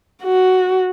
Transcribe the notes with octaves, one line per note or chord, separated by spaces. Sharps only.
F#4